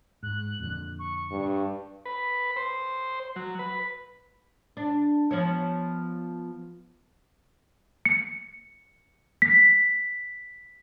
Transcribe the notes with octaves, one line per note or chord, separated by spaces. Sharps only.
G#2 F#6
F2 A#2 D3
C#6
G2
B4
C5
F#3
B4
D4
F3 B3 C#5
C#7
B6